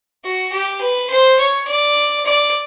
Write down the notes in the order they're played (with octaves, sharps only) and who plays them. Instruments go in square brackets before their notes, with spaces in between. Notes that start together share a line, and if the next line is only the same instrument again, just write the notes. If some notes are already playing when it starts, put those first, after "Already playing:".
[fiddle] F#4
G4
B4
C5
C#5
D5
D5